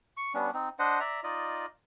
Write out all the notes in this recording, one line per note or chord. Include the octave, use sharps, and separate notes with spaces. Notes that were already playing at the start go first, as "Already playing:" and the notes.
C#6
G3 B3 C#4 D4
C4 D#4
D4 C5 D#5 F#5
D5 E5 A#5
D#4 F4 D5 D#5